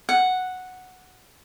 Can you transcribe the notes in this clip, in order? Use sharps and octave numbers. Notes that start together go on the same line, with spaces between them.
F#5